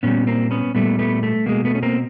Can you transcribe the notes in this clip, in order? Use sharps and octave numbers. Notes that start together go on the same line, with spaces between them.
A#2 G3 B3 C#4
A#3 C4
B3 C#4
A#2 G3 A3 B3
A3 B3
A3
B2 G#3 A#3
A3 B3
C#4
A#3 C4